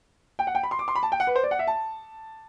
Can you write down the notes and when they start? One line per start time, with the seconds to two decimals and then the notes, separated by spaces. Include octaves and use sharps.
0.39 G5
0.47 F#5
0.55 G5
0.63 B5
0.71 C6
0.79 D6
0.88 C6
0.95 B5
1.03 A5
1.12 G5
1.20 F#5
1.27 B4
1.36 C5
1.43 D5
1.51 F#5
1.59 E5
1.67 A5